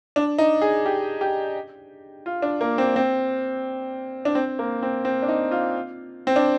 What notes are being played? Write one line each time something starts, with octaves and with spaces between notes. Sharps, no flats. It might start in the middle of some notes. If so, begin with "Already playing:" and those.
D4
D#4
G#4
G4
G4
F4
D4
A#3
C4
C4
D4
C4
A#3
C4
C4
D4
D#4
F4
C4
D4